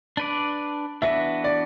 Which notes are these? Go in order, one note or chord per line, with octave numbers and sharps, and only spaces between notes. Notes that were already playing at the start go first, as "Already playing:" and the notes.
D4 B4 D5
E3 B3 D4 F#4 B4 E5
D5